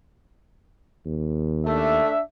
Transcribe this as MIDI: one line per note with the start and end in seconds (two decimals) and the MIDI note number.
1.06 2.01 39
1.67 2.09 57
1.67 2.22 62
1.67 2.22 76